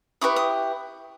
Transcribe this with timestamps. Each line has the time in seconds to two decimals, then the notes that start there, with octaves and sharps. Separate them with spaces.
0.21 E4 G4 B4 C#6 D#6
0.36 D#6